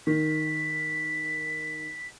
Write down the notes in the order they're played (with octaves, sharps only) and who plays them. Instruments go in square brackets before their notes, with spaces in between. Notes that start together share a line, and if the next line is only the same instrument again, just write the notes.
[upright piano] D#3 [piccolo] B6